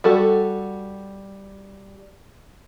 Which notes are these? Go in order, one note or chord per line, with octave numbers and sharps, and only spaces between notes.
G3 F#4 A4